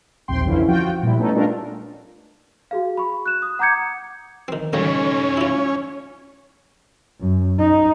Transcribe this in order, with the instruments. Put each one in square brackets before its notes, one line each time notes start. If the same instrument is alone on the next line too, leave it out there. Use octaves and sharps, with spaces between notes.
[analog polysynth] A#1 D#2 C3 G5 C6
F2 D3 E3 C#4 E4 F4
F3 F4 F#4 G5
A#2 G3 E4
A3 B3 C#4 D#4 A4
G3 A3 D4 F4 A4 A#4
[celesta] F#4 G#4 F5
B5 C#6
F#6 E7
D#6
F#5 A#5 D6 G6 G#6 C#7
[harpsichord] D#3 C4
[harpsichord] A1 D2 G3 [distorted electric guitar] A3 D#4 [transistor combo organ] C#4
[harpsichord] E4 F4
[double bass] F#2
D#4